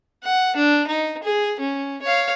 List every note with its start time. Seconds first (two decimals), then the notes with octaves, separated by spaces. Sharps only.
0.24 F#5
0.56 D4
0.87 D#4
1.23 G#4
1.60 C#4
2.02 C#5 F5